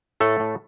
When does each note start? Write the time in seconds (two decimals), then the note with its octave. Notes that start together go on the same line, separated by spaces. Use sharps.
0.20 A2 A3 A4
0.40 A2